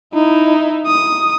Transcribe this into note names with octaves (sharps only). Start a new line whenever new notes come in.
D#4 E4
D#6